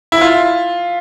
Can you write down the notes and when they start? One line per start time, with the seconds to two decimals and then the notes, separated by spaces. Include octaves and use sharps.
0.12 E4
0.21 F4